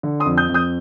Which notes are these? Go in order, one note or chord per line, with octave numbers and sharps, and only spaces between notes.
D3
C6 D#6
F2
D#6 G6
F2
D#6 G6